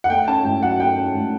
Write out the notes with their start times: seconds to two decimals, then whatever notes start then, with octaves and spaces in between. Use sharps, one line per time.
0.04 F#5
0.10 A3 G5
0.28 C#4 A5
0.45 A2 G5
0.62 F#3 F#5
0.80 A3 G5
0.97 C#4
1.15 A2